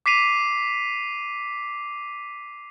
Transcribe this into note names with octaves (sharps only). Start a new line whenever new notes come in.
D6 B6 C7 D#7 F7